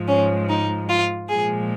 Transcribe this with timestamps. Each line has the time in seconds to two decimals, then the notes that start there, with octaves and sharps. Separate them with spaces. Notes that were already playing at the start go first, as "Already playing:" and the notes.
Already playing: G#2 F3 G#3
0.08 C#4
0.49 D#4
0.89 F4
1.29 A#2 F3 G#3 G#4